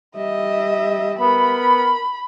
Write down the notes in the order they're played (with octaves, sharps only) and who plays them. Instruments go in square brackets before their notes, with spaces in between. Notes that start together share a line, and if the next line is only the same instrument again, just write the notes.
[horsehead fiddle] G3 E5 [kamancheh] D#5
[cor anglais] B3 [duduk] A#4 [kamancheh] B5